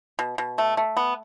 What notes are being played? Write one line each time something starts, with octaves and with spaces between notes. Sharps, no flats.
B2
B2
A3
A3
B3